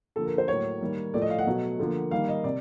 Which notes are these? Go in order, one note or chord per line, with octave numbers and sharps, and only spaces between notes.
D3 F3 A#3 A4
A#4
C5
A2 F#3 A#3 C#5
D#3 G3 A#3
A2 F3 A3 D5
D#5
F5
F#5
B2 F#3 A3
D3 F3 A#3
D#3 G3 A#3 F5
D#5
C3 D5